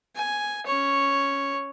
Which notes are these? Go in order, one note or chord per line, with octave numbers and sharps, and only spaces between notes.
G#5
C#4 C#5